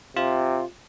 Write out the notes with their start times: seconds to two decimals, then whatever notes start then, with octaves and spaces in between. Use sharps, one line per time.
0.16 C3 F4